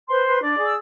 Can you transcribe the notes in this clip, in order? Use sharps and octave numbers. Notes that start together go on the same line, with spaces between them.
B4 C5 C6
B4
D4 D5 D6
G#4
E6